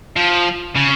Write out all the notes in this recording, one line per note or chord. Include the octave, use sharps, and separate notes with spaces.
F3
C#3